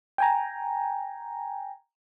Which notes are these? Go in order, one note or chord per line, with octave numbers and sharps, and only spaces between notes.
G5 G#5 A#5